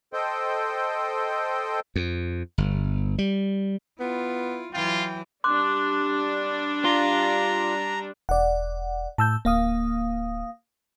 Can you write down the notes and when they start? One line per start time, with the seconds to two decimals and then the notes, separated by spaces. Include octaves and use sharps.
0.13 A4 C5 D#5 G5
1.96 F2
2.58 G1
3.18 G3
4.00 B3 E4 F4
4.74 E3 F#3 F4 G5
5.44 G3 D4 C6 D6 F#6
6.85 F4 A#5
8.29 E1 D5 F#5
9.18 A2 A5 E6 G6
9.45 D1 A#3 F5 D#6